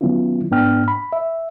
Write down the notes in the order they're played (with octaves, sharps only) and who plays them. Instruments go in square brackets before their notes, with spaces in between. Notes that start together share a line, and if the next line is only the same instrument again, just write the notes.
[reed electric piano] D#3 F#3 B3 C#4 E4 F4
G#2 B3 D4 G5 F6
B5
E5